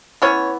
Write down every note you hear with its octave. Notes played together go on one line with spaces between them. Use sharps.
E3 B3 C#4 C#5